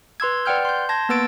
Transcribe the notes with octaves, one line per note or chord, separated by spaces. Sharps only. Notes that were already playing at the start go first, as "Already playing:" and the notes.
B4 C6 E6 G#6
B4 D5 F#5 G5 F6 G6
C6 G6
A5 C6 G#6 A#6
A#3 B3 B4 E6 A6 D7